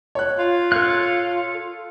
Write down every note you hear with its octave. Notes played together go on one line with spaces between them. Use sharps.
C#5 F#6
F4
A4 C#5 F5 F#6